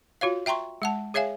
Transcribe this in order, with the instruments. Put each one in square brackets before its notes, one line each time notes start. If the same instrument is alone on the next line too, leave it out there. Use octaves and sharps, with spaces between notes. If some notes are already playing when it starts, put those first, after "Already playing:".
[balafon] F4 F#4 C#5 F5
E5 G5 A#5 C6 C#6
G#3 F#5 A5
G#4 C#5 E5 F5 G#5